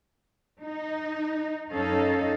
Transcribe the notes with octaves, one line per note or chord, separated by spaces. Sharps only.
D#4
F#2 C#4 D#4 A4 D#5 F5